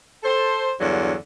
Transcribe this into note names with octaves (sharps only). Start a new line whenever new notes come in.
A4 C5
E2 G2 D3 F#3